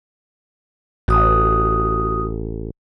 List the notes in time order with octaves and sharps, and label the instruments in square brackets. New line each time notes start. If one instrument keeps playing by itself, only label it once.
[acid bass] A1 [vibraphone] F#4 D#6